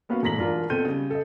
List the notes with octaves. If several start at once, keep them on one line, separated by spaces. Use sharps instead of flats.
A#3 B3 C#4 F#4 B4 F5
E1 A2 A#5 A#6 B6 F#7
E1 D4 F4 A#4
B2 C4 A4 G6 D#7
C#3 G3
A4 D#5